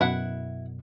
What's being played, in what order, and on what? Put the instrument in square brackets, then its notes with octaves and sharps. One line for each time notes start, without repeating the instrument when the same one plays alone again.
[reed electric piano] F#2 B2 [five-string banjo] E4 F#5